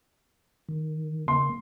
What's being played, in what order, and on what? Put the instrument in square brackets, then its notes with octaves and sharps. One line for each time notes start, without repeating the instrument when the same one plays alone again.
[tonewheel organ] D#3
[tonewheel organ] C#3 A#3 [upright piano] C6